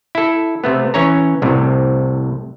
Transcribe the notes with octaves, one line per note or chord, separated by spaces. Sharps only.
E4 A4
C3 A3 B3
E3 C#4 C#5 A#5
C2 A2 C3